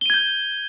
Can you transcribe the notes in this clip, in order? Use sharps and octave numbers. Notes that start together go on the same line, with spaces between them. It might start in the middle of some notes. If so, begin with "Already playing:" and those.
G6 G#6 D#7 G7